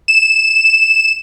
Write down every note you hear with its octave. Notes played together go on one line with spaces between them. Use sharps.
E7